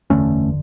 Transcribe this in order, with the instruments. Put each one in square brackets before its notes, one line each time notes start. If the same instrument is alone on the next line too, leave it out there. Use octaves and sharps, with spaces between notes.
[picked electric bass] F#1 E2 D3 A3 C#4